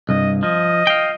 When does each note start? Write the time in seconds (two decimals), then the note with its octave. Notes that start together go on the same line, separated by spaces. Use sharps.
0.09 C2 G2 D#5
0.43 F3 D#5
0.87 F5 G5